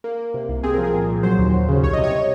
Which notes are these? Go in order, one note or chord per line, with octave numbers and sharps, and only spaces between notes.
A#3
A#3
C3
C2
C4 G#4
F3 A#4
G#4
A#2
A#2
F#3 C5
D#2
F#3
C#3
C2 C#5
C3 D#5
C#5